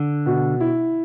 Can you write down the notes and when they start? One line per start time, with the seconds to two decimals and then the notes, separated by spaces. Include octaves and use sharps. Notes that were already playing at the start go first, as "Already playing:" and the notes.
Already playing: D3
0.26 B2
0.60 E4